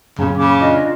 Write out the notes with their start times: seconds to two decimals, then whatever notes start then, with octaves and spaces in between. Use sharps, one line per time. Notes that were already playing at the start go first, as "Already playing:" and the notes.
0.19 F#2 A#2 C#3
0.37 C#3 B5 D6
0.60 D4 F4 D#5